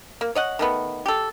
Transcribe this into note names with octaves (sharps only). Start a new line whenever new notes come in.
A#3
C#5 D#5 F#5
D#3 A3 B3
G4 A4